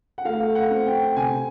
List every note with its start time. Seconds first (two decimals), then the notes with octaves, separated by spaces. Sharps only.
0.18 F#5
0.25 A3 F5
0.55 F#5
0.71 C4
0.86 G5
1.16 C3 G#5